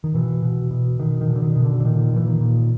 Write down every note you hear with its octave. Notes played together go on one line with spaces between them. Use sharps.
D#3
B2 E3
B2
B2
B2 D#3
D#3
B2
D3
D#3
B2
D3
D3
A#2 D#3
A#2 E3
D#3
A#2